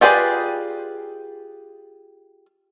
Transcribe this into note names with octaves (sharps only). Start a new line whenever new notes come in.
F4 G4 G#4 B4 D5